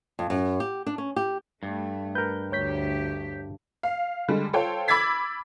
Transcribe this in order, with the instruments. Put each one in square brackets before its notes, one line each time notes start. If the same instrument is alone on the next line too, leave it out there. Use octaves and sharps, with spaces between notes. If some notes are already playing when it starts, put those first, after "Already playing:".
[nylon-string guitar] F2
F#2
G4
D4
C#4
G4
[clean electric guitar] G2 [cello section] A3
[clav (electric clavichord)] A#4 B4 [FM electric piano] G6
[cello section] D2 G4 [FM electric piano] C#5 G6 B6
[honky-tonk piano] F5
D3 G3 G#3
F4 A4 C5 C#5 G5
B5 D6 E6 G#6 A6 B6